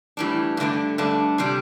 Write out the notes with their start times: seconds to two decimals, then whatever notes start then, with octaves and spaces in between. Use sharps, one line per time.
0.17 A2 E3 G3 D4
0.57 G2 D3 A3 D4
0.98 G2 D3 A3 D4
1.38 C3 G3 D4